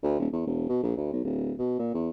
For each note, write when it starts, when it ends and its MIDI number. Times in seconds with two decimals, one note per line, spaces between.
0.03 0.18 38
0.19 0.27 27
0.33 0.42 40
0.47 0.67 28
0.69 0.79 47
0.83 0.95 34
0.97 1.07 38
1.12 1.21 35
1.24 1.53 26
1.59 1.75 47
1.79 1.89 46
1.94 2.10 40